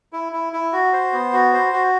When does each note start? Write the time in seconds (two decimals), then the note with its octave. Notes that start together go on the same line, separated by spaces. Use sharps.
0.13 E4
0.32 E4
0.53 E4
0.73 F#4
0.93 C5
1.13 B3
1.33 F#4
1.53 C5
1.73 F#4